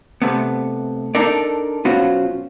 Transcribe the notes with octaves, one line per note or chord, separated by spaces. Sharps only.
C3 A3 B3
D4 D#4 A4 A#4 D5
B1 B3 C#4 F4 F#4 C5